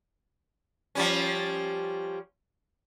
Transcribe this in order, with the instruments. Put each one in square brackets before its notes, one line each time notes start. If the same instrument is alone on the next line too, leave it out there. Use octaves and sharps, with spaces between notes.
[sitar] F3 G3 C#4